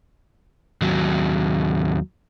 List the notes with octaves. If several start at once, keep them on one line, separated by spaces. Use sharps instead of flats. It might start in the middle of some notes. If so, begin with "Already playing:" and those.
D#2 F#3